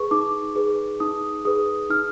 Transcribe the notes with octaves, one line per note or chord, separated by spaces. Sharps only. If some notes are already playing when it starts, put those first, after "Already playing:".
Already playing: G#4 B4 C#6
D#4 D6
G#4 B4
D#4 D#6
G#4 B4 D#6
D#4 F6